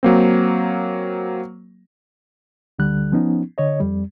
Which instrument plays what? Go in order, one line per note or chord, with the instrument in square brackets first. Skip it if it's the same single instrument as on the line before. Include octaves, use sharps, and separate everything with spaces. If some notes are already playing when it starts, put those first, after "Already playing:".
[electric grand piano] F#3 A#3 C4
[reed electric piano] D2 D3 G3 F#6
F3 B3 C#4 D#4
D3 C#5 D#5
F2 G3